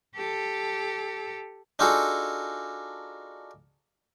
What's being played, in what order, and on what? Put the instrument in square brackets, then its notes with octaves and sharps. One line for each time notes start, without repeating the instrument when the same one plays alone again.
[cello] G4 A4
[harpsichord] D4 D#4 F4 F#4 G#4 A4